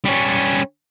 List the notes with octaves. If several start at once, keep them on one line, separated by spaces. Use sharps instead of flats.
G3 C#4